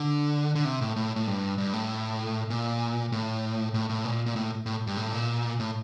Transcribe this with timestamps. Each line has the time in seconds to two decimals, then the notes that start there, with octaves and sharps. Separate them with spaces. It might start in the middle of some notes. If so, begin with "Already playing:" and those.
Already playing: D3
0.55 D3
0.65 C3
0.81 A2
0.96 A2
1.16 A2
1.27 G2
1.58 G2
1.73 A2
2.50 A#2
3.12 A2
3.74 A2
3.89 A2
4.05 A#2
4.26 A#2
4.36 A2
4.66 A2
4.87 G2
4.97 A2
5.12 A#2
5.59 A2